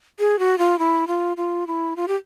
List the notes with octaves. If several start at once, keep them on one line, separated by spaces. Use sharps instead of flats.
G#4
F#4
F4
E4
F4
F4
E4
F4
G4